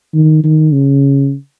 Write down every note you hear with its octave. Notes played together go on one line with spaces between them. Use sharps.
D#3
D#3
C#3